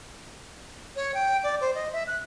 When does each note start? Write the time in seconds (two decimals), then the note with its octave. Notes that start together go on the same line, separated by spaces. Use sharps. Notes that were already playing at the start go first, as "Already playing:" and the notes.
0.96 C#5
1.14 G5
1.43 D5
1.61 C5
1.75 D#5
1.93 E5
2.07 F#6